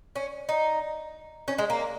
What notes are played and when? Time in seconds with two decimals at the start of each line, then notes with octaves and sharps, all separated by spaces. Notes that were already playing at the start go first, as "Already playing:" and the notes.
0.16 C#4
0.49 D#4
1.48 C#4
1.58 G#3
1.70 A#3